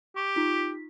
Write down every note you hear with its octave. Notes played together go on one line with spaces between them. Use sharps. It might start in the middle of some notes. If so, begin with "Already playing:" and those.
G4 C#6
D#4 F4 B6